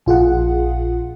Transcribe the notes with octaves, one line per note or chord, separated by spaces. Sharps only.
A#1 F4 G#4 F#5